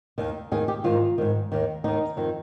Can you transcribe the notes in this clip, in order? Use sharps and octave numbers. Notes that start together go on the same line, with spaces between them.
D#2 D#3
D#2 D#3 G#4
G4
G#2 D#3 F4
G#2 D#3
D#2 D#3
D#2 D#3 D#4
F2 D#3